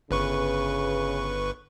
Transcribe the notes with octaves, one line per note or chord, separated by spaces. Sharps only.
G1 C#3 B4 C#6